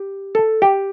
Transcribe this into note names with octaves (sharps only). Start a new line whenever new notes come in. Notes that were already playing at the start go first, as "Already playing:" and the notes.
Already playing: G4
A4
G4